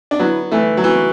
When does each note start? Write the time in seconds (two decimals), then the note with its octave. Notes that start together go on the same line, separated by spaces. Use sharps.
0.11 D4
0.19 F#3 B3 E4
0.51 E3 A3
0.77 F#3
0.84 E3 F#4